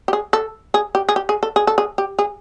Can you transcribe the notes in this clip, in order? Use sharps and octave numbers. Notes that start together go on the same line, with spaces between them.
G4
G#4
A4
G#4
G4
G#4
G4
G#4
A4
G#4
A4
G#4
G4
G#4